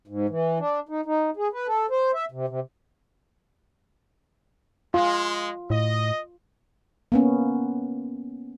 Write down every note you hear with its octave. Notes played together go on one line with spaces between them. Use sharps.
G#2
E3
D4
D#4
D#4
G#4
B4
A4
C5
E5
C3
C3
G#3 F4
A2 D#5
A#3 B3 C#4